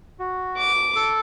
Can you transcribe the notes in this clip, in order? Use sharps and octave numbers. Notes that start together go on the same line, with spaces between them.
F#4
D6
A4